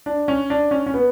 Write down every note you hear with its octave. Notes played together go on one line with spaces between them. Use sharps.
D4
C#4
D4
C#4
C#4
B3